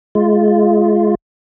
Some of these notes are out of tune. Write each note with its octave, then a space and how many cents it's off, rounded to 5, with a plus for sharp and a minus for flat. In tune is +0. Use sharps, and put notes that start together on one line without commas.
G#3 +20 F4 -10